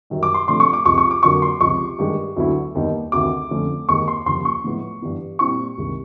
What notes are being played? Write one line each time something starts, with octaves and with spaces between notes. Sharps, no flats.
F#2 D#3 G3
D6
C6
C3 F3 A3 D4 C6
C#6
D6
C#2 C3 F3 C#6
C#6
D6
F2 D3 F#3 A#3 C#6
C6
C#2 C3 F3 C#6
G2 D#3 G#3
D2 D3 F#3 B3 E4
D#2 D#3 G3 B3 D#4
D2 C3 D#3 D6
F2 D3 F3 A3 C#4
D#2 D#3 G#3 C#6
C6
D#2 C#3 F3 C6
C#6
A2 F3 G#3 B3 E4
G2 E3 G3 B3 E4
A#2 G3 C4 E4 C#6
C2 C3 D#3 G#3